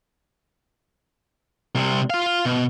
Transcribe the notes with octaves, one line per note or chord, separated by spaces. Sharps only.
C2 C3
F4 F5
B2